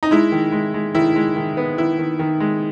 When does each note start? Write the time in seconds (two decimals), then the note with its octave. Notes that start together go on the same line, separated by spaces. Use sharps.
0.03 D#4
0.11 G#3 E4
0.32 D#3
0.52 G#3
0.74 G#3
0.95 D#3 E4
1.16 G#3
1.36 D#3
1.57 B3
1.78 D#3 E4
1.99 D#3
2.19 D#3
2.40 G#3